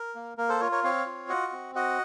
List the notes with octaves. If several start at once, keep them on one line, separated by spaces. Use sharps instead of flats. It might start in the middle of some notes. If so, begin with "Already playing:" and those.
Already playing: A#4
A#3
A#3 A#4
A4 C5
F4 A#4 C#5
A#4 C#5
C4 C#5 F5
F4
F#4 D#5 F#5
C4
F#4 D#5 F#5